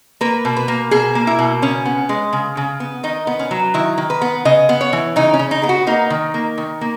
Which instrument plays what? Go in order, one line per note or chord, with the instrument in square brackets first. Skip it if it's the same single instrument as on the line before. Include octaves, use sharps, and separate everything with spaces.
[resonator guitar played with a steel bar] A#3 B4
B2
B4
A#3
B2 G#4
A#3
E4
B2
C#3 C#4
B3
G#3
C#3
C#3
B3
D#3 D#4
B3
C#4
F#3
D#3 E4
D#3
B4
B3
C#3 D#5
B3
C#5
E3
C#3 D#4
C#4
C#3
D#4
B3 G#4
F#4
A#3 D#4
D#3
A#3
D#3
A#3